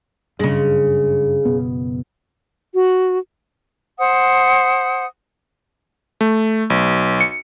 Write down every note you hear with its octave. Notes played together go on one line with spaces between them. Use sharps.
F#1 G2 C#3 G#3
F#1 B2 B3
F#4
C5 F#5 D#6
A3
B1
C#7